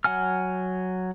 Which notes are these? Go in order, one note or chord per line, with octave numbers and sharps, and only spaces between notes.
F#3 F#5 G#5 F6